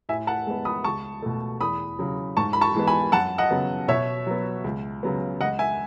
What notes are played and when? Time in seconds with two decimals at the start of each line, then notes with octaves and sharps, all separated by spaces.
0.09 A2 E5 G#5
0.27 F#5 A5
0.47 G#3 B3
0.65 B5 D#6
0.84 C#2 A5 C#6
1.22 B2 A3
1.61 E2 B5 D#6
1.99 C#3 F#3
2.37 G#2 A5 C#6
2.53 B5
2.61 A5 C#6
2.74 E3 G#3 B3
2.87 G#5 B5
3.12 F#2 F#5 A5
3.38 D#5 F#5
3.51 C#3 F#3 B3
3.88 B2 C#5 E5
4.26 F#3 B3
4.64 C#2
5.03 C#3 F#3 B3
5.41 C#2 D#5 F#5
5.59 E5 G#5